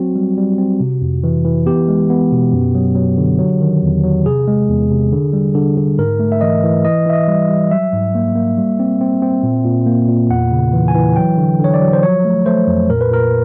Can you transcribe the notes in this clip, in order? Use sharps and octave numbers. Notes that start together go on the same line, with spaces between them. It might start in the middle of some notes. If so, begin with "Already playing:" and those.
Already playing: F#3 C4 F#4
G3
G3
C4
C3
F2
E3
E3
B3 G4
G#3
B3
B2
F#2
F#3
F#3
D3
F#3
D#3
E2
F#3
C3 G#4
G#3
E2
C3
D3
G3
D3
D3
G#2 A#4
A3
E5
E3 D#5
E3
E3 D#5
E3 E5
D#5
G3
G3
F#3 E5
G#2
A#3
A#3
G3
C4
C4
C4
A#2
A#2
A#3
A#2
E2 F#5
C#3
E3
G#5
E3
F#3 G5
D3
D3
C#5
D5
F#3
C5
F3 C#5
A3
A3 C5
F2
A#2 A#4
B4
A#2 A#4